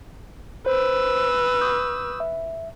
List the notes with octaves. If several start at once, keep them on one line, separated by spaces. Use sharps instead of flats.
B4 C5 E6
C#6 D#6 G6
E5